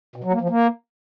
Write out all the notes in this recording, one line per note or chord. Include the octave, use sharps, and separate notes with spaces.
B2
F#3
A#3
F3
A#3